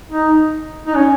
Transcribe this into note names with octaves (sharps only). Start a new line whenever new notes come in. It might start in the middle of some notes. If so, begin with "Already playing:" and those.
D#4
D#4
C#4